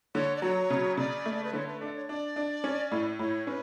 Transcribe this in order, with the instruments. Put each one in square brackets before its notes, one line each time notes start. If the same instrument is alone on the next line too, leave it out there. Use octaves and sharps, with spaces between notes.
[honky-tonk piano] D3 [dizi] C#5
[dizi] D5
[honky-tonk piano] F#3 [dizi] C#5
[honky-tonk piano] C#3
[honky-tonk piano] C#3 [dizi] D5
[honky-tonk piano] A3
[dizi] B4
[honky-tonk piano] D3 [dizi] C#5
[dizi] B4
[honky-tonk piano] D4 [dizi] A4
[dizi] C#5
[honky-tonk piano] D4 [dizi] D5
[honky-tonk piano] D4
C#4
A2
[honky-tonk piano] A2 [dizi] C#5
[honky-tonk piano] C#4 [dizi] B4